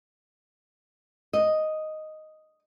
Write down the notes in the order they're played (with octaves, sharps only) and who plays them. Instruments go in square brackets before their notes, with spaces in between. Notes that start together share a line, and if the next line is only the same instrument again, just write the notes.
[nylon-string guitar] D#5